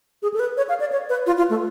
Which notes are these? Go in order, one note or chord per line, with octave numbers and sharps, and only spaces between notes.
G#4
A4
B4
C#5
F5
D5
C#5
B4
F4
F4
A3